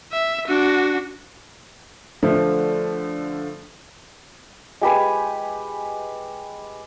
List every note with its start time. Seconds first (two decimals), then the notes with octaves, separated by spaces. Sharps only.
0.12 E5
0.48 D4 F#4
2.23 D3 F3 A3
4.81 G#3 G4 B4 G#5